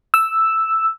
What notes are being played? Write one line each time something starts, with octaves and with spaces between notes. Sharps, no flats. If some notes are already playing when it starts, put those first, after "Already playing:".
E6